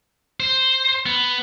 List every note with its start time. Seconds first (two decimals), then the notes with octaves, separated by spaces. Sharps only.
0.40 C5
1.06 B3